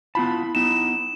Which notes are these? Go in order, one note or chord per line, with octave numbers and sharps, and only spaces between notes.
B3 E4 F4 A5 B5
B3 D#4 E7